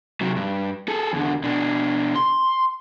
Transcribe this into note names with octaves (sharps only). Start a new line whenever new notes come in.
C3 F#3
G2
G#4 A4
E2 D3
B2 D4
C6